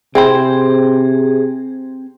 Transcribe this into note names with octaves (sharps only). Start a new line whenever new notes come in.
C3 C4 E4 G#4 C5 G5 B5